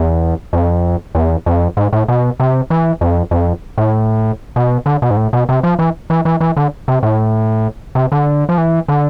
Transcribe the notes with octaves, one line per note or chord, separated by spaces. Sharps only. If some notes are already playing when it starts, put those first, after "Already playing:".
Already playing: E2
F2
E2
F2
G#2
A2
B2
C3
E3
F2
F2
A2
B2
D3
B2
G#2
A2
B2
C3
F3
E3
E3
E3
E3
D3
C3
A2
C3
D3
F3
E3
D3